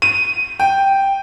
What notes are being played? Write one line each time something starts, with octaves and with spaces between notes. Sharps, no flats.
D#7
G5